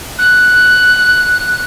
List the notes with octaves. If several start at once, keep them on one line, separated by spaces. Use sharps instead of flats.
F#6